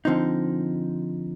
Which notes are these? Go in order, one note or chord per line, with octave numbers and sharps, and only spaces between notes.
D3 F3 C4 D#4